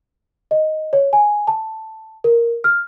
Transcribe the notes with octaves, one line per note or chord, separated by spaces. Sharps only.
D#5
C#5
G#5
A5
A#4
F6